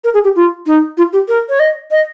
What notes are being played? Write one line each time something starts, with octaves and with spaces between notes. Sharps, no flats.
A#4
G#4
G4
F4
D#4
F4
G4
A#4
C#5
D#5
D#5